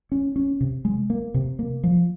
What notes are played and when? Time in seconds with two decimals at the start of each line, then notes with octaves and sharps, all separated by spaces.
0.12 C#4
0.36 C#4
0.61 C3
0.85 G#3
1.10 A#3
1.34 C3
1.59 A#3
1.84 F3